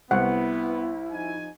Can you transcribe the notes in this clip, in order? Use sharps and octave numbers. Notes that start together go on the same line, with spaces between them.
C2 B3 E4 F#5
F3 D#4 G#5